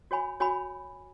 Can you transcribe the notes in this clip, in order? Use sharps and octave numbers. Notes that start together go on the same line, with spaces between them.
F#4 C#5 G#5 B5
F#4 C#5 G#5 B5